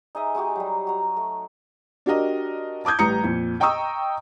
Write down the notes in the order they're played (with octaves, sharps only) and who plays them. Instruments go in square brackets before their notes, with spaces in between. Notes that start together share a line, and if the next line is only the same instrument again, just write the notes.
[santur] D#4 G#4 D#5 E5
G#3 D#4 F#4 G4
F#3 G3
F#4 A#5
A3
[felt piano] D4 F#4 G4 A#4 D#5
A5 D6 D#6 G6 G#6
A1 G3 B4 A#5 D#6 C#7
F2 A#2
D#5 G5 A#5 C#6 D#6 E6